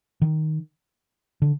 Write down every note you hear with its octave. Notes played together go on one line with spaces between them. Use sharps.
D#3
D3